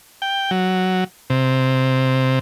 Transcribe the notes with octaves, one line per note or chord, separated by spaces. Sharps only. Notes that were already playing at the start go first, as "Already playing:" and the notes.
G5
F#3
C3